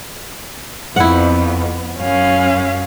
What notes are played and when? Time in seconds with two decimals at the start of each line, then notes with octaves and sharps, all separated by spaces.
0.96 F2 B3 E4 F#5
1.98 F#2 C#4 F5